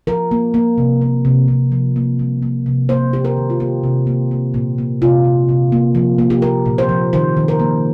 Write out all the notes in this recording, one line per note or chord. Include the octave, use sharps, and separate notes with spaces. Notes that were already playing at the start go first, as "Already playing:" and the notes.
F3 A#4
A#3
A#3
C3
A#3
C3
C3
F3
A#3
G3
A#3
C3
A#3 C5
A#3 G4
A#4
D#3
F4
A#3 G4
C3
A#3
A#3
A#2
A#3
C3 F4
C3
C3
A#3
F3
A#3
G4
A#3 A#4
A#2
C5
F3
D#3 C5
D#3
A#4
A#3